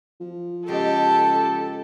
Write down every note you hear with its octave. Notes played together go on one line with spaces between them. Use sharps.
F3
C#3 G#3 B3 G4 A4 A5